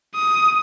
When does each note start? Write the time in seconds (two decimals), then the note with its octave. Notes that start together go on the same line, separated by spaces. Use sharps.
0.15 D#6